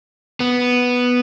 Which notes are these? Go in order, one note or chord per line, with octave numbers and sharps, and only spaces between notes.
B3